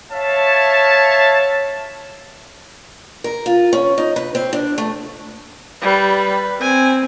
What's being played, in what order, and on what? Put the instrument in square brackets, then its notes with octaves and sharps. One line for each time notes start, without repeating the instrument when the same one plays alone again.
[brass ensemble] C#5 E5 F5 A5
[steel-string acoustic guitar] A#4
F4
C#4
D#4
B4
C4
D4
A3
[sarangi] G3 [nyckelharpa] B4
[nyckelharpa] C4 [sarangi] G#5